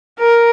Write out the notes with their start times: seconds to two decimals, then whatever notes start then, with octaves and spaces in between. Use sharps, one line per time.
0.18 A#4